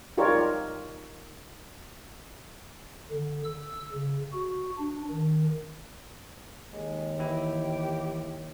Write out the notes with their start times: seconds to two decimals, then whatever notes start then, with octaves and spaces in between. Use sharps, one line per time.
0.17 D#4 F4 G4 A#4 C#5 D5
3.11 D3
3.44 E6
3.92 C#3
4.32 F#4
4.77 D4
5.11 D#3
6.72 D#2 G#3
7.19 E3 E4 G4